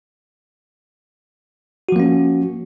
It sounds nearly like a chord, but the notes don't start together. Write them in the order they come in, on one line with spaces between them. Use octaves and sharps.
F#4 F3 A#3 C#4